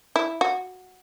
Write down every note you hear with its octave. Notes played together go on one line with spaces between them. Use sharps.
E4
F#4